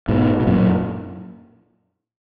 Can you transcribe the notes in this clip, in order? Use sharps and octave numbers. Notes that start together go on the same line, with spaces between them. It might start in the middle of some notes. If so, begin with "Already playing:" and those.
G#2 B2
B2
F#2 A#2